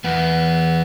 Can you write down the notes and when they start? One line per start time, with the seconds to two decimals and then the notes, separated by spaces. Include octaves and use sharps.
0.04 E2 B3